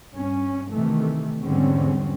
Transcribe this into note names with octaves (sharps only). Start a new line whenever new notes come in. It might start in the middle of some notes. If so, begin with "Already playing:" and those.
G2 C#4
C3 D#3 E3 A3
E2 G#2 D3 G3 C4 C#4